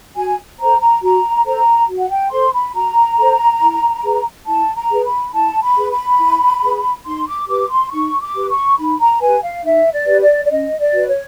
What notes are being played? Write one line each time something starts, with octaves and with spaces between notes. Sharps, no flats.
F#4 G#5
A4 C5 A#5
A#5
F#4 A#5
A4 C5 A#5
F#4
F#5
G5
A4 C5 C6
B5
F#4 A#5
A4 C5
E4
G#4 B4
E4 A5
A#5
G#4 B4
B5
E4 A5
B5
G#4 B4
B5
E4
G#4 B4
D#4 C6
D6
G4 B4 D6
C6
D#4 C#6
D6
G4 B4
C#6
D#4 B5
A#5
G4 B4 G#5
F5
D#4 E5
D5
G4 B4
D5
D5
C#4 D#5
D5
F#4 B4
C#5